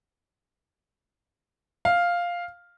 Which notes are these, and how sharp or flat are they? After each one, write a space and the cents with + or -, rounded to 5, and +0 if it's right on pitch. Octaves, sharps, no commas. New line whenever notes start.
F5 +0